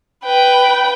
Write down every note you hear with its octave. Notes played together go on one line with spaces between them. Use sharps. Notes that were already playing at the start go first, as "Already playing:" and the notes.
B4 G5